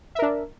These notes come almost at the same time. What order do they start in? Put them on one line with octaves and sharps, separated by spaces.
E5 A#4 D4